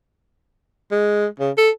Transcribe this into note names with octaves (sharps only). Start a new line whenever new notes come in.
G#3
C#3
A4